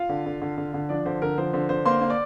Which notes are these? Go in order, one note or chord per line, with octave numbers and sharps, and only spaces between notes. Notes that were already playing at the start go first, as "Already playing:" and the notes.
Already playing: F4 F5
D3
D3
D3
D3
D3
F3 D4 D5
D3 C5
D3 A#4
F3 C5
D3 C5
D3 C5
A#3 C5 C6
A#3
D5 D6